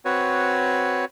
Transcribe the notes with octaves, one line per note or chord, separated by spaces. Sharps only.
C4 F#4 B4 C#5